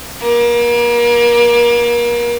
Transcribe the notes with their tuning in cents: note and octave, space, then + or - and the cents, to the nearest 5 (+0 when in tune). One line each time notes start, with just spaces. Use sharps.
A#3 +35